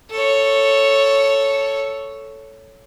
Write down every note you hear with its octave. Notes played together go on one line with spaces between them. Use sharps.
A4 C#5